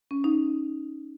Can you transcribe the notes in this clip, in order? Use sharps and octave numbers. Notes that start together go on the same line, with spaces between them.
C#4
D#4